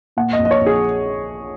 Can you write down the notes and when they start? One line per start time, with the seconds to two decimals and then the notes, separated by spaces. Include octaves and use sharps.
0.17 A#2 F#5
0.33 D#5
0.39 A#1
0.45 D#5
0.51 C#5
0.61 A#1
0.66 G#4